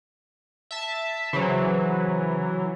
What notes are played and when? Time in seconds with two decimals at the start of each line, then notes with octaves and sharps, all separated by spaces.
0.71 E5 A5
1.33 C#3 E3 F#3 C5 C#5